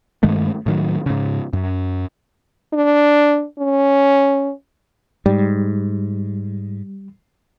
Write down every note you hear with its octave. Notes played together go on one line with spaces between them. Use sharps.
G2 D#3 G#3 A3
A2 D#3 F#3
G#2 C#3
F#2
D4
C#4
G#2 G3